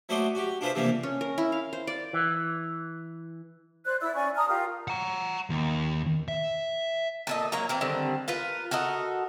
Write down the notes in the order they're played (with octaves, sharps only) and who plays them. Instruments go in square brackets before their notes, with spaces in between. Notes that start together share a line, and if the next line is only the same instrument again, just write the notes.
[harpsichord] F#3 A3 F#4 C5 D5 D#5
F#4 G4
D4 F4 G#4 B4 C5 E5
C3 E3 F3 G3 A#3 D4
[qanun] C#4
A#4
E4
F5
C5
D5
[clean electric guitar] E3
[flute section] C5 D5 F#6
E4 D5 E5 E6
C#4 D5 G#5 C#6
A5 A#5 D#6 F6
F4 G4 A#4
[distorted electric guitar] F#5 A#5
D#2
E5
[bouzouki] A#2 A4 D#5
F#3 A#3 C#5 A#5
E3 C4 A#4
D3 D#3 G3 C4
F4 A#4 B4
F#4 A4 A#4 D#5